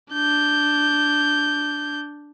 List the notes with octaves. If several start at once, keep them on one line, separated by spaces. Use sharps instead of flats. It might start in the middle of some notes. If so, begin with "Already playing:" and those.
D4 G6